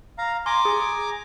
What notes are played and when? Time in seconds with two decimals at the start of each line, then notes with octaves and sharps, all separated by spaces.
0.18 F5 A#5
0.46 G#5 A#5 C6 D6
0.65 G#4